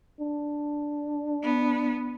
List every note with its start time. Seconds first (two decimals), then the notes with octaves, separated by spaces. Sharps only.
0.20 D4
1.43 B3